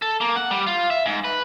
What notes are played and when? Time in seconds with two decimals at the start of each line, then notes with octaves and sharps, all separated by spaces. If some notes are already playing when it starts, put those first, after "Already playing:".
0.02 A4
0.21 A#3
0.36 F#5
0.51 G3
0.67 F4
0.90 E5
1.06 G#2
1.24 B4